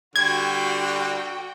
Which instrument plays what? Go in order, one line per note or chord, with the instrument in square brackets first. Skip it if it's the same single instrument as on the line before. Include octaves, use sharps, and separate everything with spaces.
[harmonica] D3 G3 D4 [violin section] F#4 G5 [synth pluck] G#6